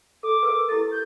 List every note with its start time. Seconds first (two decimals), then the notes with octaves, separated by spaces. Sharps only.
0.23 A4 D6
0.43 G#4 A#4 B4
0.69 E4 G4 A4 A6
0.91 G6